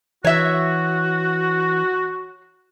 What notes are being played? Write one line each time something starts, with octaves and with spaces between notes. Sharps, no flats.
E3 F#4 C#5 E5